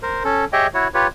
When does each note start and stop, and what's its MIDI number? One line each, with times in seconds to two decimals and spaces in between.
0.03 0.23 70
0.03 0.23 72
0.24 0.45 61
0.24 0.45 69
0.53 0.67 67
0.53 0.67 68
0.53 0.67 73
0.53 0.67 75
0.53 0.67 76
0.53 0.67 79
0.74 0.88 64
0.74 0.88 66
0.74 0.88 73
0.94 1.07 65
0.94 1.07 67
0.94 1.07 71
0.94 1.07 73